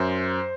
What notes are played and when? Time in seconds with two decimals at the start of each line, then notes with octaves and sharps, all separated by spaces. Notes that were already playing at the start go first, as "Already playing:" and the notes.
Already playing: F#2 C5